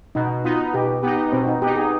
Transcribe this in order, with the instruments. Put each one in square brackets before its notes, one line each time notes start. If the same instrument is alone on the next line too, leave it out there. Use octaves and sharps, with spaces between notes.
[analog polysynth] B2 [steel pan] D#4
[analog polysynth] B3 D#4 [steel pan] F4
[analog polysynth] B2 [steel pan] G4
[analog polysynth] B3 D#4 [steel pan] G4
[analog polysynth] B2 [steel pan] C4
[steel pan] D#4
[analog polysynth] B3 D#4 [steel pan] G4
[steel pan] G#4